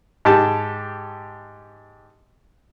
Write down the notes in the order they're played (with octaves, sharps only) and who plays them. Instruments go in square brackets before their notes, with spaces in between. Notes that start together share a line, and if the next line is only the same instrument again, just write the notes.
[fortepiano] G#2 G4 A5